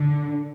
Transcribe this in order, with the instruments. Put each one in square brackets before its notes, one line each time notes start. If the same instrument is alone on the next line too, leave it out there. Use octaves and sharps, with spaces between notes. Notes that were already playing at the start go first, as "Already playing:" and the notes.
Already playing: [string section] D3